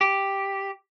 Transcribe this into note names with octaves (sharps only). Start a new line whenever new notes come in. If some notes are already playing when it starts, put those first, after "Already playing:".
G4